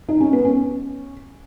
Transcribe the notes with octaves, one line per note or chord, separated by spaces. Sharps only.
D#4
C#4
B3
C#4